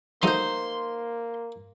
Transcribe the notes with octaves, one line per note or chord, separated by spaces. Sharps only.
F3 F#3 A3 A#3 D#4 C5 C6